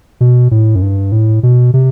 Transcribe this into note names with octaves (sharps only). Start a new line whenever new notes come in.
B2
A2
F#2
G2
A2
B2
C3